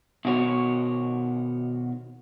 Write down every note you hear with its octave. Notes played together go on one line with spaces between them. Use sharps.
B2 D#3 F#4 C#5